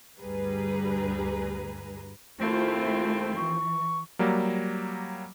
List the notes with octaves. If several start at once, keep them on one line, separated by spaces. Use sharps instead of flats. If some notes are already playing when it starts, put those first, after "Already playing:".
D2 G2 G3 G#4 B4 A#5
D#2 F3 A3 C4 E4 F4
E3 C#6
F#3 G3 A#3